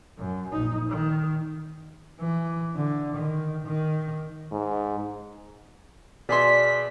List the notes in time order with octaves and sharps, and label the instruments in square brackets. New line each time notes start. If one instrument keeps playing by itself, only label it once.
[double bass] F#2
A#1 D#4
D#3
E3
D3
D#3
D#3
[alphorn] G#2
[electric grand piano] B2 G#4 C6 [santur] D5 E5 [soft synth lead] B6